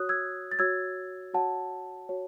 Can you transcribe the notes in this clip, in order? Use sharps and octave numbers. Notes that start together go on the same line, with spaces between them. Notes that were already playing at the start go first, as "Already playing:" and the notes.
Already playing: F#4 C#5 D#6 F#6
E6 G#6
A6
F#4 C#5 E6 G#6
F#4 C#5 F#5 A5
F#4 C#5